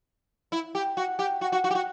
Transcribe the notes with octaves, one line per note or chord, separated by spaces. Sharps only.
E4
G4
F#4
G4
F#4
F#4
F#4
G4
F#4